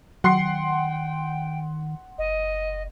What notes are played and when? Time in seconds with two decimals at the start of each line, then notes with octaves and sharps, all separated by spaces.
0.24 D#3 F#3 F#5 G5 C6 C7
2.18 F#1 D#5